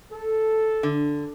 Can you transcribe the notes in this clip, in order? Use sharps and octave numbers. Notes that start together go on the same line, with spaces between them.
A4
D3